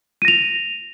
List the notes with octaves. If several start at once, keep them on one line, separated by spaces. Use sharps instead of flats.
A#6 D#7 F7